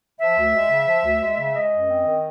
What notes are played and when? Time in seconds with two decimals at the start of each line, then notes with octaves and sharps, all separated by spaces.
0.19 F3 E5
0.36 D2
0.53 G#3
0.69 C#3
0.86 F3
1.04 D2
1.21 G#3
1.37 C#3
1.54 G#3 D#5
1.71 F#2
1.89 C4
2.05 D#3